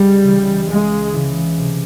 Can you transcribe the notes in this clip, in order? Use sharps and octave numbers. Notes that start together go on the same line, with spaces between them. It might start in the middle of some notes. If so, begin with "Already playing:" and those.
Already playing: C#2 G3
C#3 E3
C#2 G#3
C#3 E3
C3